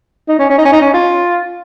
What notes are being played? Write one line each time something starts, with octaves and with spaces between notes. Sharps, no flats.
D#4
C#4
C#4
D#4
C#4
D#4
C#4
F4